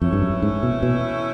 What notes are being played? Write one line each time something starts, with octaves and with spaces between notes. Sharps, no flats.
F2 E3 A3 C#4 E4
G2
F#2
G#2
B2
B2